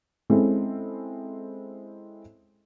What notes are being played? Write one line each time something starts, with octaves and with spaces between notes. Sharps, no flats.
G#3 C4 C#4 E4 A4